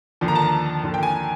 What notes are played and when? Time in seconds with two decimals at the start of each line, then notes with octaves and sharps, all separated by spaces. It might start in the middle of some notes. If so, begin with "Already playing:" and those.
0.21 D#2 D3 F3
0.28 A#5
0.35 A5
0.42 A#5
0.83 D#2 D3 F3
0.94 G5
1.03 G#5